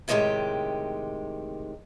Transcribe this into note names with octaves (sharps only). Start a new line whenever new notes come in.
A2 C3 D#3 G3 G#3 G4